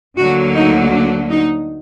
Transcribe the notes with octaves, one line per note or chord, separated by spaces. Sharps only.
D2 D3 F#3 A#3 F#4
D#4
D4
D#4